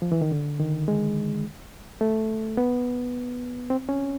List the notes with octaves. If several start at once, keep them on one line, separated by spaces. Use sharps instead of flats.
F3
E3
D#3
D3
D#3
G#3
A3
B3
C4
C#4